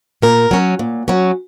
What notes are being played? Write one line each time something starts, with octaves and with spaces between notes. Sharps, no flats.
A#2 A#4
F#3 C#4
A#2
F#3 C#4